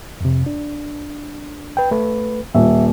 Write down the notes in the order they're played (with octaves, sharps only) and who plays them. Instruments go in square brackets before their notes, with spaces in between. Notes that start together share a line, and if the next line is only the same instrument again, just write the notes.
[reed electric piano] F2 C3
D4
B4 G5
A3 B4
[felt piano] D#1 [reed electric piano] E5